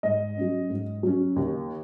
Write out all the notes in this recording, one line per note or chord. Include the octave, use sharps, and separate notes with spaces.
G#2 D#5
F#3 C#4
G#2
F#3 C#4
D#2